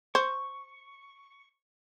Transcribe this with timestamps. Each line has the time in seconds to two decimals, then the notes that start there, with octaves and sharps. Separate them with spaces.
0.15 C5 C#6